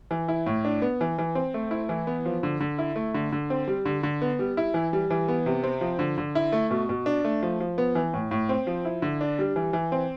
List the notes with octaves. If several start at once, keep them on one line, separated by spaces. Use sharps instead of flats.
E3
E4
A2
D4
B3
E3
E3
C4
A3
E4
E3
B3
F3
D3
D3
E4
A3
D3
D3
C4
G3
D3
D3
B3
G3
E4
E3
G3
E3
B3
C3
C4
F3
D3
D3
E4
A3
B2
B2
D4
A3
F3
F3
B3
E3
A2
A2
C4
F3
E4
D3
D4
G3
E3
E3
C4